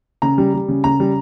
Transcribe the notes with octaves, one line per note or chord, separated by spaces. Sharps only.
C#3 A#5
G3
G3
C#3
C#3 A#5
G3